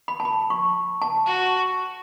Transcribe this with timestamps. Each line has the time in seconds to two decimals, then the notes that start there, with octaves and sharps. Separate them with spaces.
0.08 B5
0.20 A5
0.25 B5
0.50 C#6
1.02 A5
1.27 F#4